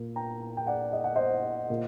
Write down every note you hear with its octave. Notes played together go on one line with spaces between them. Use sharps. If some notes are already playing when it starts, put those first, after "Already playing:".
Already playing: A#2
G5 A#5
G5
D5 F#5
D#5
F#5
C5 D#5
A#2